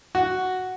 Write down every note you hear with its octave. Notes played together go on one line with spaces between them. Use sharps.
F#4